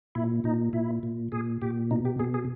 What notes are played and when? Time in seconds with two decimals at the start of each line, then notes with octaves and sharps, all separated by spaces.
0.15 A#2 E4
0.44 A#2 D#4
0.73 A#2 E4
1.03 A#2
1.32 A#2 G#4
1.62 A#2 G4
1.91 B2 D#4
2.05 G4
2.19 B2 G#4
2.34 G#4